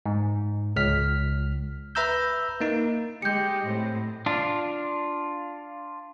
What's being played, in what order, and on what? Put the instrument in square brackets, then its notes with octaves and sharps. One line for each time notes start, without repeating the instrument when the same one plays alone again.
[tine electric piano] G#2
C#2 F6 B6
B4 E5 A#5 E6 G6
A#3 D#4
[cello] G#3 [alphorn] G4 [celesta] G6 C#7
[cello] A2 [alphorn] C4
[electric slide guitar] D4 F4